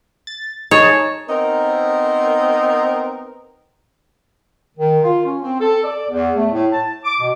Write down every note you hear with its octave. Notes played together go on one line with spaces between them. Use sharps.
A6
D#4 G#4 C#5 A5
B3 C4 D#4 A#4
D#3
F4
C#4
C4
A4
D5
E2
A3
A2
A5
D6
B2